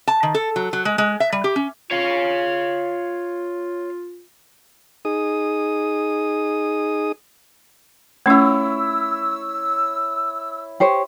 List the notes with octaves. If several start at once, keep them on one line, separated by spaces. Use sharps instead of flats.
A5
D#3
A4
F#3
F#3
G#3
G#3
E5
G3
G4
C#4
F4 C#5 F5
D#4 G#4 D#6
A3 C#4 E4 C#5 E6
G4 C5 C#5